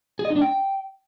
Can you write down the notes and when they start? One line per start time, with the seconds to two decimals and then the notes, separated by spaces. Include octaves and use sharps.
0.19 G#4
0.25 D#5
0.30 D#4
0.36 D4
0.41 G5